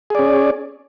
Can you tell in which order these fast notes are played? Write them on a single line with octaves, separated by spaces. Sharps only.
G#4 D5 C#4